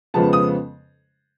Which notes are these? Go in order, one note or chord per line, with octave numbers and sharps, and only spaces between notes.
F2 C#3 F3 G#3 B3 A5
D#6